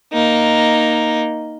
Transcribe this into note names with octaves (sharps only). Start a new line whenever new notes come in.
A#3 D#4